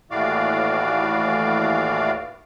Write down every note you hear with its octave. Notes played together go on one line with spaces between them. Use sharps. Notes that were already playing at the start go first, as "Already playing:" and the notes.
D#2 A2 E3 F#4 D5 F5